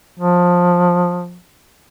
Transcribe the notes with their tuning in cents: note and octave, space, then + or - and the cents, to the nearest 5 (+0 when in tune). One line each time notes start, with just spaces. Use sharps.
F3 +20